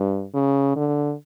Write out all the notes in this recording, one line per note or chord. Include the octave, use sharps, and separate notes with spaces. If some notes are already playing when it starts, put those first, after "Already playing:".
Already playing: G2
C#3
D3